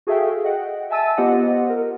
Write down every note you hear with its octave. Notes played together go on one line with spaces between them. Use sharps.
F#4 G#4 A4 E5 F5 G5
D#5 F#5 G5
E5 G#5 A5 E6 A6 D#7
B3 F4 G4 C5 D#5 F#5
A#4